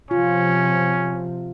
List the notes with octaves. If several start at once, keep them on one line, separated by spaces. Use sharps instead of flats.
C3 F3 C#4 F4